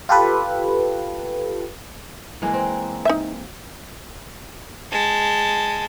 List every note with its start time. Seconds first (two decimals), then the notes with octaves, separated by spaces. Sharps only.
0.09 F4 G4 A4 B4
2.42 E3 G#3 A#3
2.54 C4
3.05 D#4 E5
4.91 G#3 A5